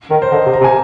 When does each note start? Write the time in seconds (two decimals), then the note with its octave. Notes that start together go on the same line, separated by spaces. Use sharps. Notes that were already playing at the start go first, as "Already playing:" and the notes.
0.11 D#3 A#4
0.22 C5
0.32 D3 D#5
0.46 C3
0.53 A#5
0.61 C3
0.64 G#5